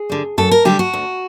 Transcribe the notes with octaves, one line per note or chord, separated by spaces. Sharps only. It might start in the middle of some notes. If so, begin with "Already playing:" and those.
Already playing: G#4
D3 G3
F#2 A4
A#4
D3 G3 G4
F#4
D2